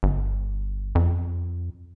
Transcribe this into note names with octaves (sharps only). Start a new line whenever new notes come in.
G1
F2